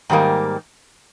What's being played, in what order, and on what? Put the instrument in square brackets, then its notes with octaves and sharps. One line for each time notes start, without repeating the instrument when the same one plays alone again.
[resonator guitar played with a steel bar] G#2 D#3 G3 A#3